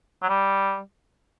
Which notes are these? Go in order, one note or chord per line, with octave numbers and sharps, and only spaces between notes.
F#3
G3